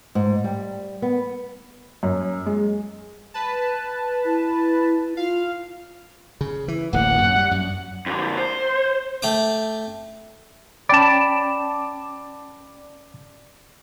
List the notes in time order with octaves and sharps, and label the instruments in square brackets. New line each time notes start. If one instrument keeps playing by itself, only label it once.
[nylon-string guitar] G#2
G3
B3
[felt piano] F#2
G#3
[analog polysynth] B4 A5
[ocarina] E4
[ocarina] F4 [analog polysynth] F5
[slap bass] C#3
E3
[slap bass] D1 A1 A#3 [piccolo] F#5
[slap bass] F#2
G3
F#2
[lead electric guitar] F2 D3
C5
[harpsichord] A3 G5 D6
[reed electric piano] C#4 G5 B5 [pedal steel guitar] D5 A5